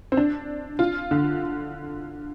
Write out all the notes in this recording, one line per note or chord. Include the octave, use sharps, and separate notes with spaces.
C4
D4
F4
D3